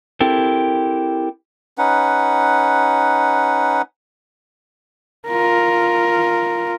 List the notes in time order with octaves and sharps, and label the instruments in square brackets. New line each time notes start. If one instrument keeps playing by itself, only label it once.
[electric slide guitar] C4 E4 G4 A4 A#4
[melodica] C#4 D#4 B4 F#5
[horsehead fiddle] F4 A#4